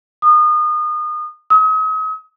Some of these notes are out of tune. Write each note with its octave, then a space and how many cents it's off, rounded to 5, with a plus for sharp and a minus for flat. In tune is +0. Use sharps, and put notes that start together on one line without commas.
D#6 -30
D#6 +40